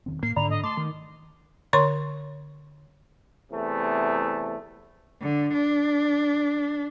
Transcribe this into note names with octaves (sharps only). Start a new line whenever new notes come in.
E1 D#3 C4
A2 A#3 C7
G#2 D3 D5 A#5 B5 F7
A2 D#5
A3 A5 C6 D6
D#3
D3 C#5 C6 C#6
E2 C3 A3
D3
D4